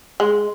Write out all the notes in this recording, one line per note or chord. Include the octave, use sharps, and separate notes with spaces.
G#3